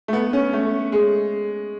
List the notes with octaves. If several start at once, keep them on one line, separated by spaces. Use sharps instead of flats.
A3
B3
C#4
A3
G#3